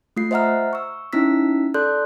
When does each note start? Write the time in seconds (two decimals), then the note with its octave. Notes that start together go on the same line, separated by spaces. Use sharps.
0.17 A3 F4 C7
0.31 C5 D#5 E5 F#5 A#5 F6
0.73 C#6 E6
1.13 C#4 D#4 E4 E6 B6
1.74 A4 D5 C6 F#6 G6